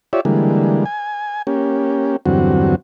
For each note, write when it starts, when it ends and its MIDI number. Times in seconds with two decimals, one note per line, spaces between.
0.13 0.21 65
0.13 0.21 67
0.13 0.21 73
0.13 0.21 74
0.13 0.21 76
0.25 0.85 50
0.25 0.85 52
0.25 0.85 55
0.25 0.85 56
0.25 0.85 58
0.86 1.42 80
1.47 2.16 58
1.47 2.16 61
1.47 2.16 67
2.26 2.75 40
2.26 2.75 43
2.26 2.75 50
2.26 2.75 54
2.26 2.75 60
2.26 2.75 66